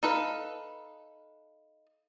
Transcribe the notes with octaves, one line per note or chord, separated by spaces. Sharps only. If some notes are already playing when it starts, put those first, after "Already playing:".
D#4 A4 B4 F5